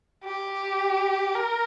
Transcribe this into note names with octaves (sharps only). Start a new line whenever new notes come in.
G4
A#4